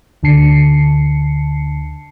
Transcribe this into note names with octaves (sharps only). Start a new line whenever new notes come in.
D2 D3 A5 C7 C#7